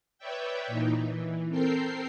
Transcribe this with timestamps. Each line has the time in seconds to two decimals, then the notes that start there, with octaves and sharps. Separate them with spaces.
0.18 B4 C#5 D5 E5 G5
0.67 A#2 E3 D#4
1.02 E3
1.49 C4 A4 A#4 G5 C7